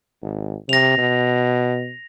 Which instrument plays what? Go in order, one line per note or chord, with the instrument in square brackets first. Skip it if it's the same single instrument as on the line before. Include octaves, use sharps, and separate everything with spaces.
[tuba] G#1
[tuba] C3 [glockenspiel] A#6 F7
[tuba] B2